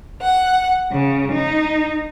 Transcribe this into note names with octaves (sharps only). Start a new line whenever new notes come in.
F#5
C#3
D#4